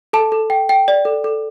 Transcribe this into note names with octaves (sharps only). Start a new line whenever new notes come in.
A4 A5
A4
G5
G5
D5
A4
A4